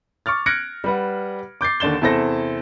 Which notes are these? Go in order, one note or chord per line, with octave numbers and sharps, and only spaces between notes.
C#6 D6 F6 A6
F6 F#6 G#6 A#6 C#7 D7
G3 B4 F#5
D6 G6 A6 C7
D#2 D3 D5 A6 E7 G7
E2 C3 E4 A4 C5 A#6